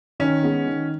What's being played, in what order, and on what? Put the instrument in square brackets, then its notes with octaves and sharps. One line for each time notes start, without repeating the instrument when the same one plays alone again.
[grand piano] D#3 [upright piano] C#4
[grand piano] G#3 B3
D#3